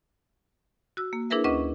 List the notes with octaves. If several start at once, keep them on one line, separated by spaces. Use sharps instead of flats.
F#4 E6
A#3
D4 E4 G#4 A#4 B4 E5
D2 C#4 B4 D#5 C#6 D6